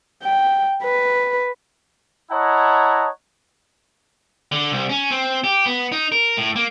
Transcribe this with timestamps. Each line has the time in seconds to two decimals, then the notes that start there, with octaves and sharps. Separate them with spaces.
0.23 G5
0.83 B4
2.30 E4 C#5 D#5 F#5 A5 A#5
4.52 D3
4.72 C2
4.90 C#4
5.10 C4
5.44 G4
5.66 B3
5.92 D#4
6.12 A#4
6.37 A2
6.56 A#3